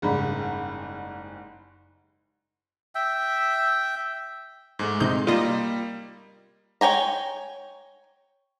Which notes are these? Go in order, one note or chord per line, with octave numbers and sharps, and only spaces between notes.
F#1 G#2 G3 B5
E5 G5
G#2 G#3 A3
C3 D#4 G6
G3 A#3 F4 D#5
C#5 G5 G#5 A#5